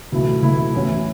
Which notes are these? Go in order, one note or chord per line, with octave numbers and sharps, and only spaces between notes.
C#2 B2 F#3 A3 E4
C#2 B2 F#3 A3 E4
A2 E3 C#4 F#4